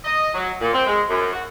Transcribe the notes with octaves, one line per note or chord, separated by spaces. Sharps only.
D#5
F#3
A#2
C4
G#3
F#2
F#4